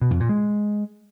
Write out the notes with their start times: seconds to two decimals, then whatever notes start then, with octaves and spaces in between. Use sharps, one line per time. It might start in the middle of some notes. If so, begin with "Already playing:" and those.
0.01 B2
0.11 F2
0.20 A#2
0.29 G#3